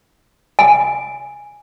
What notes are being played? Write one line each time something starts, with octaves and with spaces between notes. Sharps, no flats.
G#5